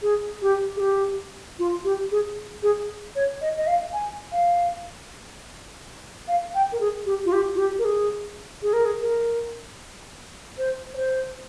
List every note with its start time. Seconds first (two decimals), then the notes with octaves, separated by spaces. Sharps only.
0.02 G#4
0.42 G4
0.76 G#4
0.80 G4
1.59 F4
1.84 G4
2.12 G#4
2.63 G#4
3.15 C#5
3.41 D#5
3.57 D#5
3.67 F5
3.93 G#5
4.32 F5
6.28 F5
6.54 G5
6.72 A#4
6.80 G#4
7.06 G4
7.26 F4
7.32 G4
7.55 F4
7.58 G4
7.79 A#4
7.85 G#4
8.63 G#4
8.73 A#4
8.85 G#4
9.01 A#4
10.58 C5
10.94 C#5
10.97 C5